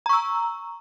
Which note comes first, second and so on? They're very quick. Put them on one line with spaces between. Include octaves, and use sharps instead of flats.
A#5 C#6 E6